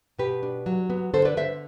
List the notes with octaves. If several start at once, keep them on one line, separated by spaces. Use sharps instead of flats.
B2 G4 B4
D4
F#3
B3
D3 A4 C5
B4 D5
D3 C5 E5